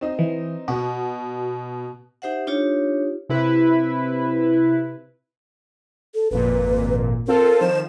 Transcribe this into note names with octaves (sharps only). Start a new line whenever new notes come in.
C4 D#4
E3
B2 F#4
D#4 G4 C5 E5 F#5
D4 D#4 F4 G4 C#5
C3 E4 B4
A4
G#1 F2 A#2 B4
C4 F4 A4 A#4
D#3 F3 C5 E7